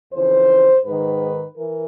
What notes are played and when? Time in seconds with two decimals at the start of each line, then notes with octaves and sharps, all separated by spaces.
0.13 F2 C#3 E3 C5
0.85 G#2 D#3 B4
1.57 E3 A#4